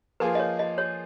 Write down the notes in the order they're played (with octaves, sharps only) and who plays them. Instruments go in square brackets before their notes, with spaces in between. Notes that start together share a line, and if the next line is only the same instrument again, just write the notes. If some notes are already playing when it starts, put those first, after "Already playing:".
[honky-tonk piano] F3 A#3 F4 G#4 [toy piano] B4
[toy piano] D#5
C#5
D#5
C#5